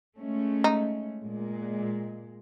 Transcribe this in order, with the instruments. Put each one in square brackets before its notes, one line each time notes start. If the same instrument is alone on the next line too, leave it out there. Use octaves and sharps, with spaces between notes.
[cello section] G#3 A3 C#4
[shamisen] D#4
[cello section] A#2 G#3